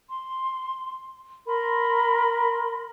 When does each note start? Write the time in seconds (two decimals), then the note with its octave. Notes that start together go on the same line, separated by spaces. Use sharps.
0.09 C6
1.47 A#4 B5 C6